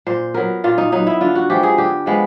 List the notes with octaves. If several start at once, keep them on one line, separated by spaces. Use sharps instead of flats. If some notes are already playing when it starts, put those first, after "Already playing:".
A#2 C5
F#3 B3 A#4
A#2 F4
D#4
F#3 B3 D#4
E4
D3 F4
F#4
F3 G#3 B3 G4
G#4
D3 G4
F3 G#3 B3